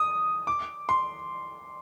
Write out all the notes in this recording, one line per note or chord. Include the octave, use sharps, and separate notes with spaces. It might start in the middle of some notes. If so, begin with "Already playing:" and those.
Already playing: D#6
D6
C6